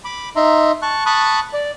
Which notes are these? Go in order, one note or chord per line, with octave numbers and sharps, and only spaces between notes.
B5 D6
D#4 E5 A#5 C6
A5 C#6 F#6
A5 B5 C#6 D#6 F#6
D5